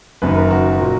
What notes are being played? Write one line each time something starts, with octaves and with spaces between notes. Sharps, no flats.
F#1 F#2 D#3 B4
A#4
F#4
A#2 F#3